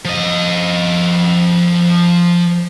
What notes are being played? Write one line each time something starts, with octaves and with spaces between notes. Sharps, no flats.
F3 D#5